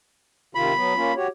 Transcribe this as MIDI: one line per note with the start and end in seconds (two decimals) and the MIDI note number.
0.55 0.73 48
0.55 0.73 51
0.55 0.73 65
0.55 1.14 83
0.75 0.93 54
0.75 0.93 59
0.95 1.12 58
0.95 1.12 61
0.95 1.12 65
1.15 1.28 66
1.15 1.28 67
1.15 1.28 73